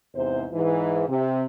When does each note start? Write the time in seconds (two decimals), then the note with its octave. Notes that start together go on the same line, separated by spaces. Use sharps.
0.15 E2 G#2 C3 C5
0.52 G#2 E3
1.08 C3